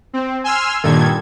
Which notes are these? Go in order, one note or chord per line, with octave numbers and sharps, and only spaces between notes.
C4
G#5 C6 E6 F6
G2 A#2 D#3 A4 G#6